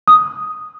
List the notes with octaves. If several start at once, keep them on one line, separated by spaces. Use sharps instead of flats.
D#6